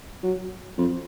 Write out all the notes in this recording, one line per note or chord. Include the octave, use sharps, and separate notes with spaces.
F#3
F2